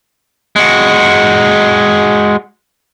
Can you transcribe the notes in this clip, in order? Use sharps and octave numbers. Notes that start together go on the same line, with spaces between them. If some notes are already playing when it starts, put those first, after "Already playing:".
G#3 F#4